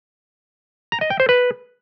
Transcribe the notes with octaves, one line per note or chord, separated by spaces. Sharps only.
A#5
D#5
G5
C5
B4